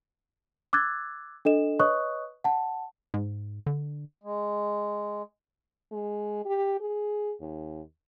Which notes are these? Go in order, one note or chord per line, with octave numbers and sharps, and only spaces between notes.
D6 E6 F#6 G#6 A6
D4 A4 D#5 E7
B4 C#5 D#5 C#6 D#6 F#6
F#5 A5
G#2
D3
G#3
G#3
G4
G#4
D#2